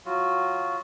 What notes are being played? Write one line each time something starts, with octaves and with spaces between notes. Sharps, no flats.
F#3 F4 F#4